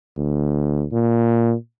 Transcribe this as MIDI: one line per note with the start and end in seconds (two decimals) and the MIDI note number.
0.17 0.86 38
0.93 1.54 46